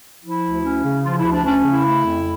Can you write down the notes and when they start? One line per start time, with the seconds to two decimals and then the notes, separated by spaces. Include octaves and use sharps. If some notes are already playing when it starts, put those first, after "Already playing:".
0.23 F3 E4
0.43 D2
0.64 C#4
0.84 C#3
1.04 F3 F4
1.18 E4
1.25 D2
1.31 D4
1.44 C#4 D4
1.65 C#3
1.72 E4
1.84 A3
2.05 F2